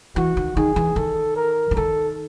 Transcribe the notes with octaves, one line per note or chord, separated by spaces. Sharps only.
E3 F#4
D#3
D#3 G#4
E3
D#3 A4
A#4
E3
D#3 A4